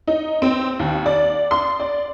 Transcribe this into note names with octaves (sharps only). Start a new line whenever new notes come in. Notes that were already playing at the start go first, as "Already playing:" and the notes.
D#4
C4
D#2
D5
C6
D5